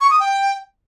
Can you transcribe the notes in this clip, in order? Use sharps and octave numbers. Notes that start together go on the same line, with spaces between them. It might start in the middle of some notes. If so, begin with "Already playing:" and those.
C#6
D#6
G5